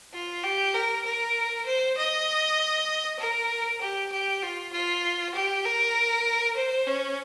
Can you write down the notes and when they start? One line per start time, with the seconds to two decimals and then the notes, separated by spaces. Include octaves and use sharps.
0.14 F4
0.43 G4
0.74 A#4
1.05 A#4
1.66 C5
1.97 D#5
3.19 A#4
3.81 G4
4.12 G4
4.43 F4
4.72 F4
5.34 G4
5.65 A#4
6.56 C5
6.87 C#4